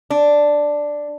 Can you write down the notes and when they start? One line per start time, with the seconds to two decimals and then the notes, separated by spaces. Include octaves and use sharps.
0.10 D4